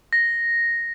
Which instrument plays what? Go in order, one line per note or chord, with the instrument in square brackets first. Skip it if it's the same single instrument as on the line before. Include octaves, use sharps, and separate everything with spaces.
[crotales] A#6